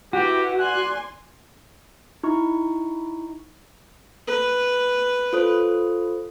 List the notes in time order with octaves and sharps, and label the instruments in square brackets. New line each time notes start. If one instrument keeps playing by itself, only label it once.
[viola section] E4 B4 [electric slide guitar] F#4 [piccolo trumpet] G4
[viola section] D5 G#5 C6 [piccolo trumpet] F#6
[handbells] D#4 E4 C#6
[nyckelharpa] B4
[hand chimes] F4 A4 C5